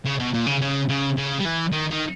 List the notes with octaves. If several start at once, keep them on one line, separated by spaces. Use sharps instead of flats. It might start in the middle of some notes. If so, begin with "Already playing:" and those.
C#3
B2
A#2
C#3
C#3
C#3
C#3
G3
E3
D#3
D#3